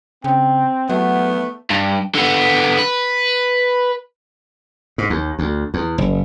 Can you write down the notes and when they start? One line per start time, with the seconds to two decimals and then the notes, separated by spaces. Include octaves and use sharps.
0.24 C#3 C4 G5
0.89 F#3 A3 B3 F#5
1.71 G2
2.15 D3 B3
2.79 B4
4.98 G#2
5.10 D#2
5.39 D2
5.74 E2
5.98 F#1